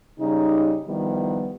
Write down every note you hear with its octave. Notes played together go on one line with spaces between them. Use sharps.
C#3 G3 D#4
D#3 F3 G3 B3 E4